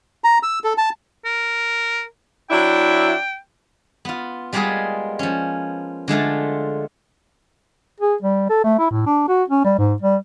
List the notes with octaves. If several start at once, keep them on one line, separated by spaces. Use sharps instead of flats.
A#5
E6
A4
A5
A#4
F#3 D4 E4 G5
B3 F4
G3 G#3 A#3 B3 F4 G#4
F3 C#4
D3 G#3 A3 F4
G#4
G3
A4
A3
E4
A2
D4
F#4
C#4
G3
G#2
G3